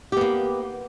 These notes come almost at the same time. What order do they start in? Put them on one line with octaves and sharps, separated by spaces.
G4 B3 A#3